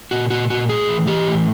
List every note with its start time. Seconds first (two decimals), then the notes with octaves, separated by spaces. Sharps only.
0.11 A#2 F#4
0.30 A#2 F#4
0.50 A#2 F#4
0.69 A2 G#4
0.89 E3
1.07 E3 G4
1.27 A2